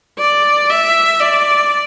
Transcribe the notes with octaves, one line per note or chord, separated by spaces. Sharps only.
D5
E5
D5